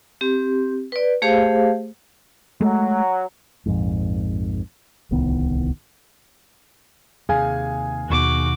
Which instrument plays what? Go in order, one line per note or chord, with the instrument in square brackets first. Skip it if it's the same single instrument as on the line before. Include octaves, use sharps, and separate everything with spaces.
[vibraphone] C4 G4
B4 D5
A3 G4 G#4 C5 F5
[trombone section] F#3 [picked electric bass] G#3 A3
[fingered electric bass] A#1 F2 G#2
D1 C2 D#3 B3
[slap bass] D#2 C3 [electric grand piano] G#4 F5 G#5
[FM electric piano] D#2 B2 [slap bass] D#3 [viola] F#4 D6